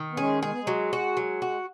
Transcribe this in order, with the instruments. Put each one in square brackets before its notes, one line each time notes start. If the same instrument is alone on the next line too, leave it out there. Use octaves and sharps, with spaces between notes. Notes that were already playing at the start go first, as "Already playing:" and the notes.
Already playing: [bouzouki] D#3
[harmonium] B3
[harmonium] G#3 C#4 [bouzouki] G#4
[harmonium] G#3 [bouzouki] G#4
[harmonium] B3
G#3
[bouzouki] F#3
F#4
F#3
F#4